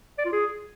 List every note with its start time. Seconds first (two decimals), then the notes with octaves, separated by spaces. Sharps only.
0.18 D5
0.25 F4
0.32 G#4